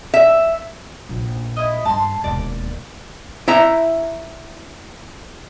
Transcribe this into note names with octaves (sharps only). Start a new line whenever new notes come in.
E5
A#1
E4 D#5
G2 A5 A#5 C6
E1 D#2 D5
E4 E5 A#5